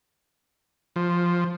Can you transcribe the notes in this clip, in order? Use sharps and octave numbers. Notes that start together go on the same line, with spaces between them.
F3